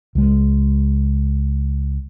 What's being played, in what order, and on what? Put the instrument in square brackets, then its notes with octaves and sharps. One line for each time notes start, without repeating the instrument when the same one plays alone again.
[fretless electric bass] C#2 G#3